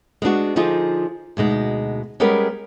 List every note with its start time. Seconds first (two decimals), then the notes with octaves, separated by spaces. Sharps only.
0.22 G#3 B3 D4 F#4
0.56 D3 F3 D#4 F4 G#4
1.37 D2 B2 G#3 D#4
2.20 G3 G#3 B3 C#4 A#4